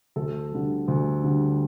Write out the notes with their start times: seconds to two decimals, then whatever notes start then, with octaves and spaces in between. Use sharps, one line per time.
0.16 D2 A4
0.52 D3 G3
0.88 D2
1.24 D3 G3